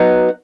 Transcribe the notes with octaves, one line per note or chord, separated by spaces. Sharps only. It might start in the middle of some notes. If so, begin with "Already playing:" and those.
Already playing: F#3 B3 D#4